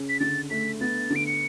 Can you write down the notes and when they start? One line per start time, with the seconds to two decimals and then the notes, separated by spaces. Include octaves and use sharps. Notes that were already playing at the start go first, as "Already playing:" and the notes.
Already playing: C#3 C#4
0.09 B6
0.20 D3 A6
0.50 A3 B6
0.81 B3 A6
1.10 D3
1.16 D7
1.27 C#7